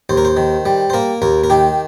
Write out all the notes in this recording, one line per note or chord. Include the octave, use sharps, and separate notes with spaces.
D#2 C5
A#4
C5
D#3
G3
C5
A#3 A#4
D#2 A#4
A#4
D#3 G4